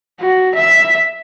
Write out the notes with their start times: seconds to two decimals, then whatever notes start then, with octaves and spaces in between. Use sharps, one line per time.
0.20 F#4
0.55 E5